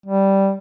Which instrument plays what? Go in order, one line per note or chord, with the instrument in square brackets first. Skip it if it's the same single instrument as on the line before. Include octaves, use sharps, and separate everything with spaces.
[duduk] G3